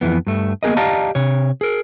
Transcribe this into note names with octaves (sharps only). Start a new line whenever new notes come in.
F2 E3 B3
G2 A3
A#3 B3 G#4 A#4 D#5
G4 D5 D#5 F5 A5 A#5
C3 C#5
G#4 A#4